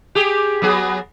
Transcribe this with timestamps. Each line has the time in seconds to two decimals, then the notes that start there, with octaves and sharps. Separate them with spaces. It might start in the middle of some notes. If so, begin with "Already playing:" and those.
0.15 G4 G#4
0.62 F#3 B3 G#4